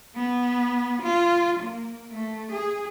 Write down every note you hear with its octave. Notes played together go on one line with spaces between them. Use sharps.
B3
F4
A#3
A3
G#4